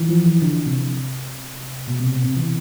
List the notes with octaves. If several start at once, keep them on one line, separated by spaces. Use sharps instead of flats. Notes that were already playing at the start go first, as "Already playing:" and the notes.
Already playing: E3
F3
E3
D3
C3
B2
C3
C3
C3
E3